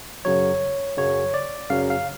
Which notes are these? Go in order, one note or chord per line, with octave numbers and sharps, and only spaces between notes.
F#2 C#3 F#3 C#5
F#2 C#3 F#3 C#5
D5
F#2 C#3 F#3 F5
F5